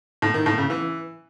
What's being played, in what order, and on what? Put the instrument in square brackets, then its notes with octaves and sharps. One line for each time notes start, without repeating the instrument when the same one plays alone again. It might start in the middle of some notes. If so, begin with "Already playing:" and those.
[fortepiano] A2
D#3
A2
C#3
E3